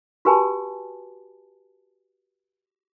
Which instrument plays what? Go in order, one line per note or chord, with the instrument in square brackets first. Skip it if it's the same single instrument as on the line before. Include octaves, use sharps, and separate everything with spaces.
[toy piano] F#4 G4 B4 G#5 A5 B5